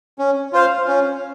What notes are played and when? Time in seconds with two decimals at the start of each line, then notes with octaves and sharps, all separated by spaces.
0.19 C#4
0.53 F4 C5 F5
0.87 C#4